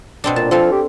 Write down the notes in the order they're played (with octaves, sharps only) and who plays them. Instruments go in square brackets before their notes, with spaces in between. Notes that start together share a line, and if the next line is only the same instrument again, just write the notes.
[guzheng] B2 C4 D4
[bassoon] A#2 [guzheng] A5
[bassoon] F3 [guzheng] C4 A4 F5
[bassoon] G4